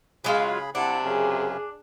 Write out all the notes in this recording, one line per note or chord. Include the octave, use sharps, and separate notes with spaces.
C#3 F#3 G#3 F4 G#4 B5
C3 D4 E4 F#5 A5
F#2 C#3 C#4 G#4